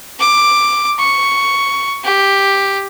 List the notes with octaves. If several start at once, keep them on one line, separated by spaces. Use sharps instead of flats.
D6
C#6
G4